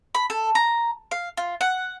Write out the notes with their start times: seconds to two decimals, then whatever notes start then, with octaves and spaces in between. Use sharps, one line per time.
0.15 B5
0.30 A4
0.55 A#5
1.11 F5
1.37 F4
1.61 F#5